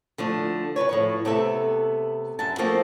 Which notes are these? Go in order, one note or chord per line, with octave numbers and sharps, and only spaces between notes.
D3 F3 A3
C#3 F#3 B4 C#5
A2 F3 C#5
C3 A3 B3 C4 A4 E5
F#2 E5 A5
F3 A3 A#3 C4 F4